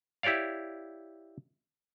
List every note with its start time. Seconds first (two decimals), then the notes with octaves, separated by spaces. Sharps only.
0.23 E4 G4 C#5 D5 F5